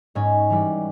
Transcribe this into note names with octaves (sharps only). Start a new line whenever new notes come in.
G#2 C#4
E3 G3